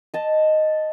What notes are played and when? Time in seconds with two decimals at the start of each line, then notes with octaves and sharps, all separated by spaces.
0.14 D#5 A5